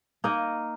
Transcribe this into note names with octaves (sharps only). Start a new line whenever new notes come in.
A#3 D#4 A#4 D#5